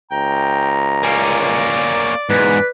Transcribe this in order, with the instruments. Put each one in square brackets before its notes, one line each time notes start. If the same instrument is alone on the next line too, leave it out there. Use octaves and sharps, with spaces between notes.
[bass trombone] C#2 [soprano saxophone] G5 [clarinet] A#5
[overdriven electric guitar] A#3 C#4 [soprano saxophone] D5
[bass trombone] F#1 [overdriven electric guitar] E2 G#2 [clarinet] B4